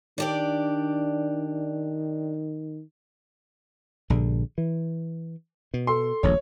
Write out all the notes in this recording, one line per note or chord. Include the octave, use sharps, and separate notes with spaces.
D#3 D4 G4 D5
A#1 G2 D3
E3
B2
A4 C6
D#1 A#1 C#5